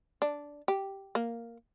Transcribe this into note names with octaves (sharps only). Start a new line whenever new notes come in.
D4
G4
A#3